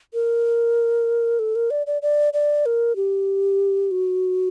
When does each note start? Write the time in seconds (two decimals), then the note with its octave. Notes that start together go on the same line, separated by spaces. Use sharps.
0.14 A#4
1.39 A4
1.55 A#4
1.70 D5
1.87 D5
2.02 D5
2.33 D5
2.66 A#4
2.96 G4
3.91 F#4